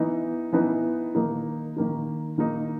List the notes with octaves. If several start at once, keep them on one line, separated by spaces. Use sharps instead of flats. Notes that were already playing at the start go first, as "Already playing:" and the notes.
Already playing: E3 B3 D#4
E3 B3 D#4
D#3 A#3 D#4
D#3 A#3 D#4
D#3 A#3 D#4